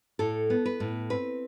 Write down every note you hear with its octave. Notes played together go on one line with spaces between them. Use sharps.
A2 A4
B3
B4
A2
C4 B4